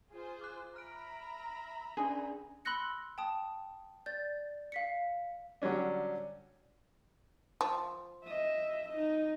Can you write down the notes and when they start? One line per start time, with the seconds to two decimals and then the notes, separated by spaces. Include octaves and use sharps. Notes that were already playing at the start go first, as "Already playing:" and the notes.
0.11 F4 G#4 C5
0.41 D6 F#6
0.76 E5 A#5 B5 F6 D7
1.97 C#4 D4 G#4 D5
2.65 B5 C6 E6 F#6 A#6 C#7
3.18 G5 A5 D#6
4.06 D5 G6 A6
4.72 F5 B6 C#7
5.62 D3 F#3 G3 C#4 D4
7.61 F3
8.24 D#5 E5
8.89 D#4 D#5